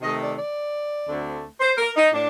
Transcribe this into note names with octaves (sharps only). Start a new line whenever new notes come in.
C3 D#3 A3 D#5
D5
D5
D2 D3 A3 C4
C5
A#4
D#4
A2 D4